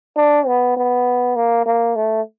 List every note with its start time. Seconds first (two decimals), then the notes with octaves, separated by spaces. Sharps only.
0.16 D4
0.47 B3
0.77 B3
1.36 A#3
1.66 A#3
1.96 A3